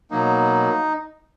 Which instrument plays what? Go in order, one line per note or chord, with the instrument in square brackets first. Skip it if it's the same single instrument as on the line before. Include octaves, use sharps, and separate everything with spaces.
[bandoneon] B2 F#3 A#3 D#4